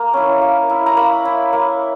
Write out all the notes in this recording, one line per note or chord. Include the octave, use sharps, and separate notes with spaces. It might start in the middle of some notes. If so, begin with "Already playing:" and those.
Already playing: A#3
C#4 E4
A#3
E4
A#5
A#3 B5
E4
A#3